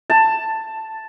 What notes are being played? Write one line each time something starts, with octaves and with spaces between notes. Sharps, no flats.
A5